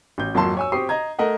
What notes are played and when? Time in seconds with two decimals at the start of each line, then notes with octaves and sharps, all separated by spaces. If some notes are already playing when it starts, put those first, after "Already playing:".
0.18 A1 G6
0.34 G#1 F2 F#3 A#3 A5 C6
0.57 C#5 G#5 E6
0.72 C4 G4 C#6 D#6 C7
0.89 D#5 A#5 G#6
1.19 A3 A#4 D#5 F#5